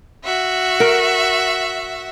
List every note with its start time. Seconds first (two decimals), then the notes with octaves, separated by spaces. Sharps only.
0.24 F#4 E5
0.80 A#4